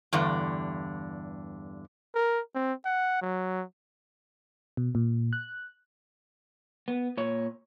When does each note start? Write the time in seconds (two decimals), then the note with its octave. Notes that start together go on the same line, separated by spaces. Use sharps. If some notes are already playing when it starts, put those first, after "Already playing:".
0.13 E2 G2 D3
2.15 A#4
2.55 C4
2.85 F#5
3.22 F#3
4.77 B2
4.95 A#2
5.33 F#6
6.88 B3
7.17 A#2 C#5